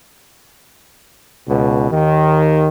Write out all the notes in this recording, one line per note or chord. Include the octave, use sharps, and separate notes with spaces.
C#2 B2
D#2 D#3